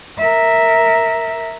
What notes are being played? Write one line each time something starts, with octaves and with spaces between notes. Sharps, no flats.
A#4 E5